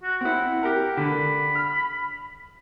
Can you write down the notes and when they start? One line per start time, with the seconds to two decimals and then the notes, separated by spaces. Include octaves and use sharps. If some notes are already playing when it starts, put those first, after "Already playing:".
0.03 F#4
0.21 C4 E4 F#5
0.63 G4 A#4
0.97 D3 B5
1.55 F6